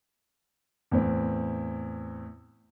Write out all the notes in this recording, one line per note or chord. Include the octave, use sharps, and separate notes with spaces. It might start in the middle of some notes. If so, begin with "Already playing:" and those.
E2 A2 C4